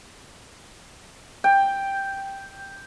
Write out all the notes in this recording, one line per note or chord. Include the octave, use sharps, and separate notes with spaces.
G5